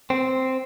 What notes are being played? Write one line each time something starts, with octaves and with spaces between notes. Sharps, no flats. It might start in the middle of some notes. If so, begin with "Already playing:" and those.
C4